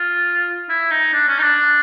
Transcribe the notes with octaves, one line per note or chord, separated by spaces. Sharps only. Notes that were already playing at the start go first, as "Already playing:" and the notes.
Already playing: F4
E4
D#4
D4
C#4
D#4
D4